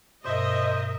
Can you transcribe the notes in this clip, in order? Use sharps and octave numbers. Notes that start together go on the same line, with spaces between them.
G2 B2 A#4 C5 D#5 E5